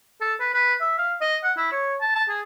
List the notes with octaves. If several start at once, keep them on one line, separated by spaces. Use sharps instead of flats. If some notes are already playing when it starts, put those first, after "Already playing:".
A4
B4
B4
E5
F5
D#5
F#5
E4
C#5
A5
A5
G#4